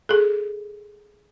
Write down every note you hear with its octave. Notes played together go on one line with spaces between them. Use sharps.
G#4 A4